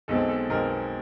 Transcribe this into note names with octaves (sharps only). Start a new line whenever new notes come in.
B1 B2 G#3 C4 A4
A4
B1 B2 G#3 C4 A#4